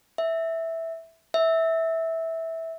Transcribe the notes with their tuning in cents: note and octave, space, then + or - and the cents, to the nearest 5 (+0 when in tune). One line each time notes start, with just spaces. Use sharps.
E5 -5
E5 -15